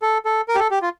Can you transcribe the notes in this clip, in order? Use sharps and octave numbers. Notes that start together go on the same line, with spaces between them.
A4
A4
A#4
G4
A4
G4
F4